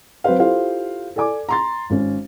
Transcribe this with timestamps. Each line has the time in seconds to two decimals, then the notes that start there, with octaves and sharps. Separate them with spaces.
0.24 F#3 C4 B4 C5 F5
0.39 E4 F4 G4 A4 C5 F5
1.16 A4 D5 G#5 D6
1.49 A#5 C6 A6
1.90 G#1 C#4